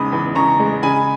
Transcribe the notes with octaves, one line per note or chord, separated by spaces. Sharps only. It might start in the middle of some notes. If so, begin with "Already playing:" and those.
Already playing: E2 C#3 G#3 D#4 B5 D#6
E2
C#3 A#5 C#6
G#3
C#3 G#5 B5